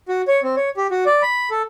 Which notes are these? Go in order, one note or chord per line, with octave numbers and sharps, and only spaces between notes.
F#4
C#5
C4
C#5
G4
F#4
D5
B5
A4